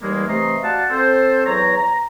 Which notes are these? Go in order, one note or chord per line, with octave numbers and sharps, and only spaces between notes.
D#2 E3 G3 G#3 A#3
C3 E3 A3 D#5 A#5 C6
F#4 D5 F5 F#5 A5
C4 A4 C5
E2 F#3 C#5 A#5
A#5